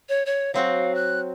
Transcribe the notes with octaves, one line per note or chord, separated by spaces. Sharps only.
C#5
C#5
F#3 C4 F#4 F5
F#6